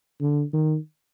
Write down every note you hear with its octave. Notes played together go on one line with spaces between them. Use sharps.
D3
D#3